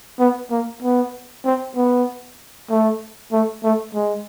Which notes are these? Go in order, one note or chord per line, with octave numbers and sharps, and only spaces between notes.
B3
A#3
B3
C4
B3
A3
A3
A3
G#3